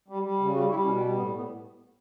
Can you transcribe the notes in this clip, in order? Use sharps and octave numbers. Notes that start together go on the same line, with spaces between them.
G3
G3
C#3
G3 F#4
G3 E4
B2 C#4
G3
A2 B3
A2 B3